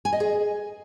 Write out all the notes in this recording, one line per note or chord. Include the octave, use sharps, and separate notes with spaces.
G#5
D#5
G#4